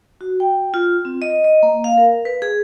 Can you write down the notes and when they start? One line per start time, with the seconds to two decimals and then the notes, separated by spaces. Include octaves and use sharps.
0.21 F#4
0.40 G5
0.74 F4
1.05 C4
1.22 D#5
1.44 D#5
1.63 A#3
1.84 F5
1.98 A#4
2.25 B4
2.42 G#4